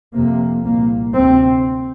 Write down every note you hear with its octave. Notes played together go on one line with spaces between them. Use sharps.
F2 C3 A#3
C2 A#2 A#3
D2 C3 C4